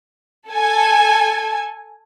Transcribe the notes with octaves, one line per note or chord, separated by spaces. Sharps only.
A4 G#5